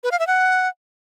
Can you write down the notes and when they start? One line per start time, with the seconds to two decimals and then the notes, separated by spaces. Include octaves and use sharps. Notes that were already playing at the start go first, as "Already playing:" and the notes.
0.04 B4
0.12 F5
0.19 E5
0.27 F#5